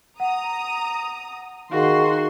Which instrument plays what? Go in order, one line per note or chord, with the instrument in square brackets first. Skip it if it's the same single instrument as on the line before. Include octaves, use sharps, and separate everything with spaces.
[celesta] F#5 [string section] A#5 D#6
[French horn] D#3 [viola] F#4 [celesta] G#4 F5 [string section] C6